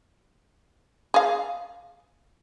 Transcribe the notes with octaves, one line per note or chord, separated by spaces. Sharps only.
G#4 F5